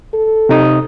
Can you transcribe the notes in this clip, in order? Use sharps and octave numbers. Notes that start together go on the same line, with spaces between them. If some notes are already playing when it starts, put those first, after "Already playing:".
A4
C3 D#4 D#6